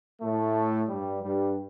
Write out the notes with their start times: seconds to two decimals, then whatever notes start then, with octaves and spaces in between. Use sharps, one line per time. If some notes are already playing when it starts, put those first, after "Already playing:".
0.21 A2 A3
0.89 G2 G3
1.23 G2 G3